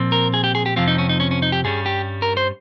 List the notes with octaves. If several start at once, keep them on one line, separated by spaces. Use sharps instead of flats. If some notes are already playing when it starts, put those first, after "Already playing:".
Already playing: A#2 F3 C4
A#4
G#4
G4
G#4
G4
F2 C3 F3 C4 F4
D#4
C#4
D#4
C#4
C#4
D#4
G4
G2 G3 C#4 G#4
G4
A#4
C5